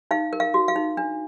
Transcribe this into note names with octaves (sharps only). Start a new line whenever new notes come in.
D#4 F5
A#4
F5
F#4
F5
D#4
D4